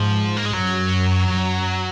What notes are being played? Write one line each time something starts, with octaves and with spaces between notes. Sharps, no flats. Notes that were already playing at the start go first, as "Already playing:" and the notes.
Already playing: G#2 F3
A#3
G#3
F#2 F#3
F#2